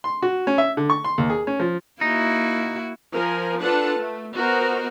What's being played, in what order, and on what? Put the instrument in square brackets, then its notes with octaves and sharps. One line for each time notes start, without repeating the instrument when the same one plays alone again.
[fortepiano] C6
F#4
C#4
E5
D3
C#6
C6
D#2
G#4
C#4
F3
[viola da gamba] A#3 E4 F#4 [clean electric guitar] D#4
[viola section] F3 A#4 G#5
D4 F4 A4 B4 F#5 A5
A3
B3 F#4 A#4 C5 D#5